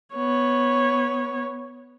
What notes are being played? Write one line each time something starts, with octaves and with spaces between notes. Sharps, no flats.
B3 C#5